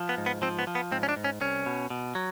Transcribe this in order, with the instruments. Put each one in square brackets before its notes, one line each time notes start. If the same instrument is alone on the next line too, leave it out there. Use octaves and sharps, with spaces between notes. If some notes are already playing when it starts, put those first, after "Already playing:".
Already playing: [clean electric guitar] F3
B3
G#2
B3
F3 C4
B3
F3
B3
G#2 C4
C#4
D4
G#2
C#4
C2 C#4
B2
B2
F#3